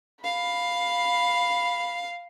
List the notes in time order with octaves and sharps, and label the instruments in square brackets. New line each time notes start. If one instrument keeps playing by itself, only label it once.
[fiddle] F5 [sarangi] B5